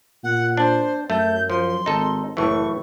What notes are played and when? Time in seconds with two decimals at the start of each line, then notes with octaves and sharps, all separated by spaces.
0.24 A#2 F#5
0.57 D4 C5
1.10 F#2 A3 G6
1.50 F3 C6
1.86 G#1 D#4 A4
2.37 F#1 A2 E3 C#6